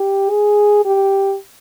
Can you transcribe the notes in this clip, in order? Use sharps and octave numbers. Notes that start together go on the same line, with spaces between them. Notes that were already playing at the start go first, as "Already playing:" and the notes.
Already playing: G4
G#4
G4